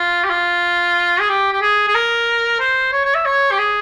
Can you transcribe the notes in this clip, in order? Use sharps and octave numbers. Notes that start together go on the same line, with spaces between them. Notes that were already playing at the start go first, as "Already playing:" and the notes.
Already playing: F4
G4
F4
G#4
G4
G4
G#4
G#4
A#4
C5
C#5
C#5
E5
C#5
G4
G#4